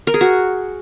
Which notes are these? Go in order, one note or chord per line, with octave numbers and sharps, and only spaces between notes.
A#4
G#4
F#4